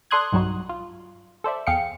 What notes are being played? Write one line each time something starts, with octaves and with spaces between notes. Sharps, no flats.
A4 D5 C6 D#6 F#6 G#6
B1 G2 F#3 G3 D#4 F#4
F4
A4 C5 D5 E5
E2 G#4 F5 G5 C#7